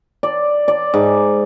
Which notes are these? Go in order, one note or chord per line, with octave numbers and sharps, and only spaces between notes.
D5
D5
G#2